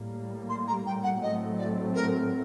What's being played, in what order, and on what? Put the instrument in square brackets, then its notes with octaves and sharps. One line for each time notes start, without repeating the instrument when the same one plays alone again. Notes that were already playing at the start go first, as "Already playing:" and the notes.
Already playing: [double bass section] A2 G3 A#3
[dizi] C6
A#5
G5
F#5
[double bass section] A2 F#3 A3 C4 [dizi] D#5
[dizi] D5
A#4